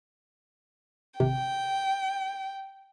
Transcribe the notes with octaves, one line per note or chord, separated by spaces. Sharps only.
G#1 C3 G5